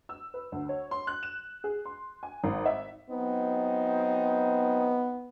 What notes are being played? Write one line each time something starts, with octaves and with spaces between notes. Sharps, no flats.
E6
B4
D2
C#5
C6
F#6
E7
G#4
C6
G#5
G#1
E5
F#3 B3 C4 D#4